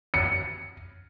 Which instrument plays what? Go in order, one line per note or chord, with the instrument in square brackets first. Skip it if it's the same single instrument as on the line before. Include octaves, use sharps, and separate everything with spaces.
[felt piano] C#7